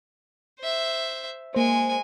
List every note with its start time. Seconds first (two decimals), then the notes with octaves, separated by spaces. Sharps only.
0.59 C5 E5
1.54 G#3 A#3 C5 G#5